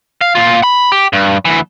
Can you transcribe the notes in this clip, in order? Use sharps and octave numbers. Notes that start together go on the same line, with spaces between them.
F5
A#2 F4
B5
G4
G2
D2 E3